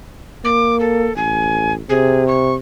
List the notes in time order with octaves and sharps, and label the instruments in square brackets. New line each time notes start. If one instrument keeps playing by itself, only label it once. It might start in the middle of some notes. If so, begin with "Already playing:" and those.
[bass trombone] A#3 [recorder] D6
[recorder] A4
[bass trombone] A1 [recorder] G#5
[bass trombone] C3 [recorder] G#4
[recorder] C#6